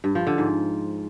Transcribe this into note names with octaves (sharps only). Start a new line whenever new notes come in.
G2
F3
D3
G#2